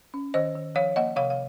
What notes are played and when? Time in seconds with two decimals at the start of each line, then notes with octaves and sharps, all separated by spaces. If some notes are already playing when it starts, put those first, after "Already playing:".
0.14 C#4
0.34 D#3 C5 D#5
0.55 D#3
0.75 F3 C#5 F5
0.96 A#3 D#5 F#5
1.16 C3 C#5 F5
1.30 F5